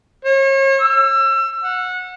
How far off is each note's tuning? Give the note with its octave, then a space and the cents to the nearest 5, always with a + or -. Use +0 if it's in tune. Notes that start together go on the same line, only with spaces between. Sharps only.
C#5 -40
E6 +30
F#5 -25